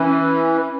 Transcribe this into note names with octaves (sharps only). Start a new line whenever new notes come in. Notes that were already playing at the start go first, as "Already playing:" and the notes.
Already playing: E3 C#4